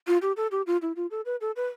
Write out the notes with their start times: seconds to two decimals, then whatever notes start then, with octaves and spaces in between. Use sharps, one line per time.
0.07 F4
0.22 G4
0.37 A4
0.51 G4
0.67 F4
0.82 E4
0.96 F4
1.11 A4
1.26 B4
1.41 A4
1.56 B4